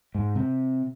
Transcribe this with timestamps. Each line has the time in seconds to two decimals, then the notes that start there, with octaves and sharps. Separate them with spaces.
0.15 G#2
0.35 C3